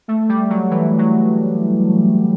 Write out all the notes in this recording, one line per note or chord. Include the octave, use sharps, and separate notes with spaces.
A3
G3
F#3
E3
F#3